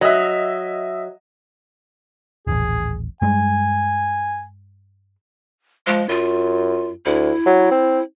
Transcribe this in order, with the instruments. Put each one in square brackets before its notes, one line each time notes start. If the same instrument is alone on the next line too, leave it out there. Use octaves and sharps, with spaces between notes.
[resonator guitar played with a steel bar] F#3 [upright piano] D#5 E5
[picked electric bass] D#1 A1 [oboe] G#4
[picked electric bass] G2 G#3 [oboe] G#5
[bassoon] F3 [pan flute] G#3
[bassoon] F#2 [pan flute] F4
[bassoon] D2 [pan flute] E4
[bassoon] F#3
C4